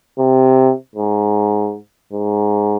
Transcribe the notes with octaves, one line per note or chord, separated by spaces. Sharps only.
C3
G#2
G#2